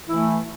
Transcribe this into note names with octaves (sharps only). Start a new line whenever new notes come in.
E3 A3 E4